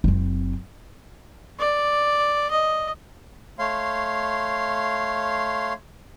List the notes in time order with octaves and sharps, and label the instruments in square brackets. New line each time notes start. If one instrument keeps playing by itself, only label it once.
[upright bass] F#1 C4
[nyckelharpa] D5
D#5
[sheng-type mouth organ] A3 C#5 F5 C6